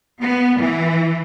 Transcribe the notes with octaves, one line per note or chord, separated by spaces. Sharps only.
B3
E3